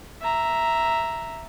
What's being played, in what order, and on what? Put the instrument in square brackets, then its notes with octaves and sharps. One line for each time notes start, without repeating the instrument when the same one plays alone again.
[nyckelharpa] E5 A#5